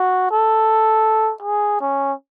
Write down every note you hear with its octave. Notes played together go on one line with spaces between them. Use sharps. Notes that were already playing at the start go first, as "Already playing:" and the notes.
Already playing: F#4
A4
G#4
C#4